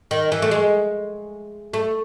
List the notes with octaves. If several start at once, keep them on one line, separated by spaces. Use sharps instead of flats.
D#3
E3
A3
G#3
A3